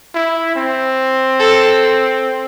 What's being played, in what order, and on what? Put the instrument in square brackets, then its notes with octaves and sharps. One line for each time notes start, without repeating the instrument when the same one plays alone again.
[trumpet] E4
C4
[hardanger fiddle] A4